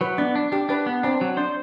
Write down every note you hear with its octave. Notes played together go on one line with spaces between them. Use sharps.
F#3 B4
B3 D4
D4
D4 G4
D4 B4
B3
C4 D4
F#3
D4 C5